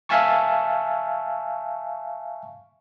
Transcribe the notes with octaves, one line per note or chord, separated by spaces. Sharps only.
E5 F5 G#5 A5 C#6